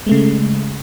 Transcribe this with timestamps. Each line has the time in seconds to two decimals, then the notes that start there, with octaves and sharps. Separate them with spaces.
0.06 G#3
0.09 A3
0.12 C#3